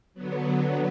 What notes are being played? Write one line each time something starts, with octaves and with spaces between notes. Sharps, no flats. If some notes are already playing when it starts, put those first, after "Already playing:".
D3 F#3 B3